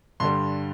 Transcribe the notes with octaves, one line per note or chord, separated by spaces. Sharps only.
G2 D3 G3 C6